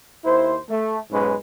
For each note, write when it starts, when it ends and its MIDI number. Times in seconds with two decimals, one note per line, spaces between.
0.25 0.58 39
0.25 0.58 64
0.25 0.58 72
0.69 0.99 57
1.11 1.35 35
1.11 1.35 44
1.11 1.35 56
1.11 1.35 61
1.11 1.35 71